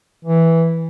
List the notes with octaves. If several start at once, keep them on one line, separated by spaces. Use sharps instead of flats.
E3